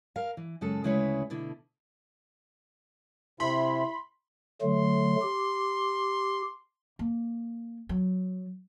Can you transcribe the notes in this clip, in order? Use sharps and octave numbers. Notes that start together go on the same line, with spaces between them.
A#4 F5
E3
F#2 C#3 G#3 A4
D2 C#3 G#3 E4 B4 C#5
B2 D3 E4
C3 E4 B5 C6
D3 F#3 A3 C6
G4
A#3
F#3